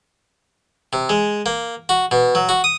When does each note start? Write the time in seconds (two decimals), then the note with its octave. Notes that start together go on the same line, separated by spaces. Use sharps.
0.93 C3
1.09 G#3
1.46 A#3
1.89 F#4
2.11 B2
2.35 F#3
2.49 F#4
2.64 D#6